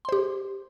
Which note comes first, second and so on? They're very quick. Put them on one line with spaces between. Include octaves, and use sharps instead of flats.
C6 C5 G4